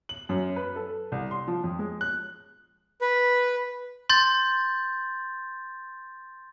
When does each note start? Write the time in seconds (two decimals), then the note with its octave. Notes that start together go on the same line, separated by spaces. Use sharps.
0.09 F#7
0.29 F#2
0.56 B4
0.76 A4
1.12 C2
1.31 C6
1.48 F3
1.64 F2
1.79 G#3
2.01 F#6
3.01 B4
4.10 C6 G6 A6